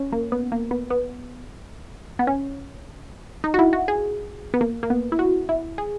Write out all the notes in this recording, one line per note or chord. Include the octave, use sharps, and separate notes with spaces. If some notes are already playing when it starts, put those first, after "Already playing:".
Already playing: C#4
A#3
B3
A#3
B3
B3
B3
C#4
D#4
F#4
E4
F#4
G#4
B3
A#3
A#3
B3
E4
F#4
E4
G#4